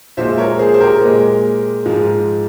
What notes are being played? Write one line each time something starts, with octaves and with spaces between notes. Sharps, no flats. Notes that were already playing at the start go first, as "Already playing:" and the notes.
A#2 F3 G#3 C5 E5
A#4 C#5
G#4 C5
C5
G4 A#4
A#2 G#3
G#2 F3 G#3